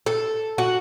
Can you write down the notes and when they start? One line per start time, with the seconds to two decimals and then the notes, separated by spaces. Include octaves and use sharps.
0.06 A4
0.58 F#4